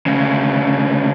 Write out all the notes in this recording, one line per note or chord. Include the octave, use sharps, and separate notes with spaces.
D2 C#3